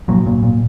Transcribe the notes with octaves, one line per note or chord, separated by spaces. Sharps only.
A#2 F#3
A#2
A#2